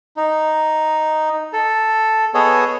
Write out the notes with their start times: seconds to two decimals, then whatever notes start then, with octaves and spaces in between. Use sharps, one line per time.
0.17 D#4
1.53 A4
2.34 B3 G#4 A4 C#5 D#5